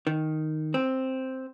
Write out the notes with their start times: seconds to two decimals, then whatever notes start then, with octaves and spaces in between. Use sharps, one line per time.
0.07 D#3
0.74 C4